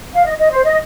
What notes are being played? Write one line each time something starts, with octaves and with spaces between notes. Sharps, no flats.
F5
D#5
D#5
C5
D#5